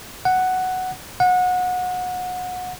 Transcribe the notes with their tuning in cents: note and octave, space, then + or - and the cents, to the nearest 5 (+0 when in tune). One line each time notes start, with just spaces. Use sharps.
F#5 +5
F#5 -25